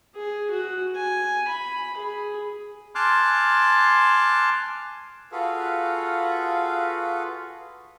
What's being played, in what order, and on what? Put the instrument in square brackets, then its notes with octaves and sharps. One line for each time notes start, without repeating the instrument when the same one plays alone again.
[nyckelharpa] G#4
F#4
G#5
B5
G#4
[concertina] G#5 A5 C6 D6 F6 F#6
[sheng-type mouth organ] F4 F#4 G#4 A4 B4 F5